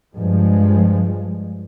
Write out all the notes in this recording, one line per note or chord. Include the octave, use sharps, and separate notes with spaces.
G2 F3 G#3